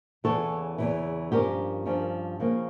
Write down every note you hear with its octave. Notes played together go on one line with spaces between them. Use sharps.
E2 C#3 E3 A4 C#5
E2 C#3 E3
G2 F3 C#4 G4 A#4
G2 F3 C#4
C#3 F3 A#3 C#4